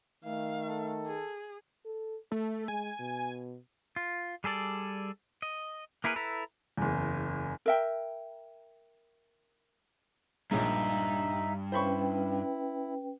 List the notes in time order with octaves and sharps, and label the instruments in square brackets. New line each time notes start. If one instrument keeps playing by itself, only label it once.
[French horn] D#3 [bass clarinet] A3 [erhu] F5
[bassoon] A4
[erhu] G#4
[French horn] A4
[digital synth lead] A3 [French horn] A4
[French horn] G#3 [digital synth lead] G#5
[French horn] B2
[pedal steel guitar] F4
G3 G#4 A4 D5
D#5
A#3 E4 G#4 A#4 B4
E4 A4 B4 A#5
[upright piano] F#1 E2
[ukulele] A#4 E5 G5
[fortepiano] A#1 G#3 [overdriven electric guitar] G2 [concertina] D#4 E5
[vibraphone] C#4 B4 G5 [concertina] E4 [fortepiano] C5 B5 C#6